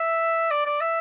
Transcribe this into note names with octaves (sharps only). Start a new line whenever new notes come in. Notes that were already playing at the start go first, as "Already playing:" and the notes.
Already playing: E5
D5
D5
E5